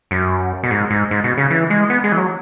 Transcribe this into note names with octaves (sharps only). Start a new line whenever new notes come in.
F#2
B2
G#2
G#2
G#2
B2
C#3
E3
G#3
B3
G#3
E3
F#3